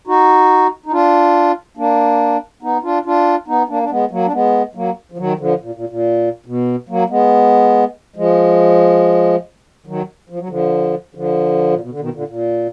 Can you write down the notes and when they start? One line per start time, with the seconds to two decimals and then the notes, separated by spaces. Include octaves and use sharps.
0.07 D#4 F#4
0.86 D#4
0.91 D4 F4
1.77 A#3 D4
2.63 B3 D#4
2.83 D4 F4
3.06 D4 F4
3.48 B3 D#4
3.69 A#3 D4
3.83 D4
3.90 G#3 B3
4.11 F#3 A#3
4.26 D4
4.32 G#3 B3
4.75 F#3 A#3
5.12 F3
5.18 D#3 F#3
5.39 D3 F3
5.61 A#2
5.75 A#2
5.89 A#2
6.46 B2
6.89 F#3 A#3
7.10 G#3 B3
8.16 F3 G#3
9.86 D#3 F#3
10.29 F3
10.39 F#3
10.49 D3 F3
11.15 D3 F3
11.71 A#2
11.81 B2
11.91 D3
12.00 B2 D#3
12.14 A#2 D3
12.28 A#2